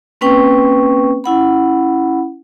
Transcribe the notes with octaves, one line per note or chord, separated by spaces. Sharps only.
A#3 C4 C#4 B4 G5 C#6
C#4 E4 F#5 B5